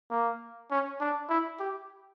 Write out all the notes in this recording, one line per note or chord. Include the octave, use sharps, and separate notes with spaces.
A#3
C#4
D4
E4
G4